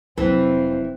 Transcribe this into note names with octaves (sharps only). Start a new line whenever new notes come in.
F1 E3 F#3 C4